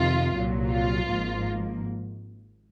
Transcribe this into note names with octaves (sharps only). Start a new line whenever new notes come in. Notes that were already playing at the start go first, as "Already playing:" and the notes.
Already playing: F2 C3 D#3 F4
C2 A#2 F#3
F4
G#1 G#2 F3 A#3